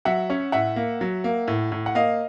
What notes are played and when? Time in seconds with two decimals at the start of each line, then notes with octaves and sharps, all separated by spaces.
0.05 F#3 E5 F#5
0.30 C#4
0.52 A2 E5 F#5
0.76 A#3
1.01 F#3
1.24 A#3
1.48 A2
1.72 A2
1.86 F#5
1.95 A#3 D#5 F5